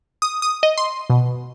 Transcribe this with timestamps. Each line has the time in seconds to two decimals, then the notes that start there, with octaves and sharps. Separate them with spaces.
0.22 D#6
0.42 D#6
0.63 D#5
0.78 C6
1.10 B2